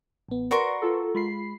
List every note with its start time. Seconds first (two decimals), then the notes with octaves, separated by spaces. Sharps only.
0.29 A1 B3
0.51 F#4 A#4 B4 D5 C6 C#6
0.82 F4 A4
1.15 G#3 F4 B5 C7